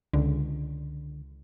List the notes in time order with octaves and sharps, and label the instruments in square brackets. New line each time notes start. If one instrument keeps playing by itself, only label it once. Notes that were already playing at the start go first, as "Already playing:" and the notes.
[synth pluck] C#2 [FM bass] D3